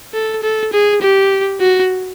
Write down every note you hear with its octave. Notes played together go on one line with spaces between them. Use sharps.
A4
A4
G#4
G4
F#4